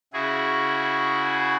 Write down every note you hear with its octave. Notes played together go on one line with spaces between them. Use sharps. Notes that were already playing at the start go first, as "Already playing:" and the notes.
C#3 E4 F#4 G#4